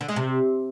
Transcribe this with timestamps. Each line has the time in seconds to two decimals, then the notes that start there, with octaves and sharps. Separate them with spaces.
0.01 D3
0.08 G#3
0.16 C3